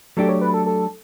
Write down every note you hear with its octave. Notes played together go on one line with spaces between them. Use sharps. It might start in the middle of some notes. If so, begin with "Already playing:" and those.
F#3 A3 D4 G4 A4
C#5
B4
A4
A4